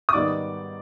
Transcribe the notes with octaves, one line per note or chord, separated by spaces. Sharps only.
D#6
G#2 D#3 G3 B3 D#4 D5 D6